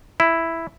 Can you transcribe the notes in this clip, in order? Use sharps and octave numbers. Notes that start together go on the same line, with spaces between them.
E4